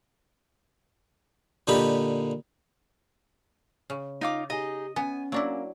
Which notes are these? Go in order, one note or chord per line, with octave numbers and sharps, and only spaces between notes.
A#2 D3 D#4 G4 B5
C#3
D#4 F4 D#5 D6
D#4 G4 G#4 D#5
B3 C#4 G#5
F#3 A#3 D4 E4